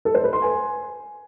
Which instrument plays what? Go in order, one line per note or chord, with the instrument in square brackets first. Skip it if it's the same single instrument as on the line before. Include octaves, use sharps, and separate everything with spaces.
[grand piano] A4
C5
B4
C6
G#5